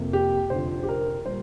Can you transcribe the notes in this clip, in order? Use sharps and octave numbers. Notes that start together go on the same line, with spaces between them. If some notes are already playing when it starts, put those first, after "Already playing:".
Already playing: F2 C3 A#3
G4
F1 F2 D3 F3 C5
G4
A#4
A#2 G3 A#3 C5